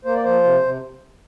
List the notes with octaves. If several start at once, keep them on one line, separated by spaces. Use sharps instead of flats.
A#3 C5
D5
F3 C5
C3
C3